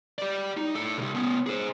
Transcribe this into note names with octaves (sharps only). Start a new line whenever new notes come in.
G4 D5
D#4
A2 A4
C2 B2
B3 C#4
G#4 C5